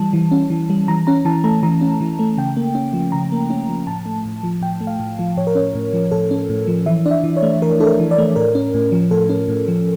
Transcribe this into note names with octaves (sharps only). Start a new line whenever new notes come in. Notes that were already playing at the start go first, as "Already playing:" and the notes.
Already playing: E3 G3 A5
E3
C#4
E3
G3
E3 A#5
C#4 A#5
E3 A5
A3 A#5
E3 A#5
C#4
E3
A3
C#3 G5
A#3
C#4
F3
C#3 A#5
A#3
C#4
F3
A2 A5
A3
A2
F3
A2 G5
A3
F5
A2
F3
A2 C#5
A#4
C#4 C#5
A2
F3
A2 A4
C#4
A2
F3
E3 E5
D4 D5
E5
E3
C#5
A3
E3 A#4
D4 A4
A#4
E3
D5
A3
A2 A#4
C#4
A2
F3
A2 A4
C#4
A2
F3